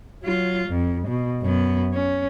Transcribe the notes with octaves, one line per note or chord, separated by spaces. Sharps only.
F#3 F4
F2
B2
F#2 B3
C#4